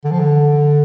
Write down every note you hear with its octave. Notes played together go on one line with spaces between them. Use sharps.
D3
F3
D3